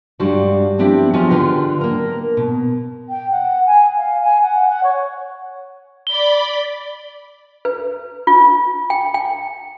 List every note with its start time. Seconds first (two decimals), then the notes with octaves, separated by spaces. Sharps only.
0.19 G2 G3 G#3 D4 F#4 F5
0.78 F3 B3 C4 D4 E4 G4
1.13 F3 C#4 F4 F#4 G#4 D#5
1.30 D3 F4 B4 G5
1.81 A#3 A#4
2.37 B2
3.09 G5
3.31 F#5
3.66 G#5
3.97 F5
4.23 G#5
4.42 F#5
4.69 F#5
4.83 C#5
6.07 D5 B5 G7
7.65 B4
8.27 F4
8.90 G5
9.14 G5